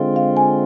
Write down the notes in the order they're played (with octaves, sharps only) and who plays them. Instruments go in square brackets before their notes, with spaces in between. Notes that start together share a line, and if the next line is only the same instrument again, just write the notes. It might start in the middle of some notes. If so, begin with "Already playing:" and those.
Already playing: [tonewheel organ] D3 G#3 C4 F4
[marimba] F5
G#5